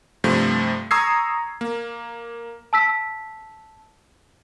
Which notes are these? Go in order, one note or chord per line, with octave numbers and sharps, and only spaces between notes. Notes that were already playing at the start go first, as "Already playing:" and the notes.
G2 C3 F3 A3
A#5 C#6 D#6 E6 G#6 C7
A#3
A5 E6 B6